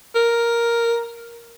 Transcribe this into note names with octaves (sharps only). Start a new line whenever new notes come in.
A#4